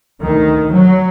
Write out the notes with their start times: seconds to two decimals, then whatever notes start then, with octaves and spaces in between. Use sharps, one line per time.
0.21 D2 D#3
0.73 F#3